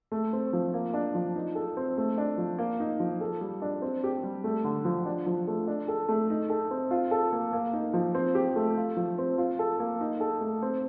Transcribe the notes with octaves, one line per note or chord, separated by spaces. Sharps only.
A3
C4
F3
A#3
D4
F3
D#4
A4
C4
A3
D4
F3
A#3
D#4
F3
A4
G3
D4
C4
G4
G3
A3
D3
F3
D4
F3
A3
D4
A4
A3
D#4
A4
C4
F4
A4
A#3
A#3
D#4
F3
C4
G4
A3
F4
F3
C4
F4
A4
A#3
D#4
A4
A3
C4